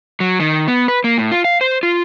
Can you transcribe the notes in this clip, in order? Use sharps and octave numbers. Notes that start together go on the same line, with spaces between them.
F#3
D#3
B3
B4
A#3
A2
F4
F5
C5
F4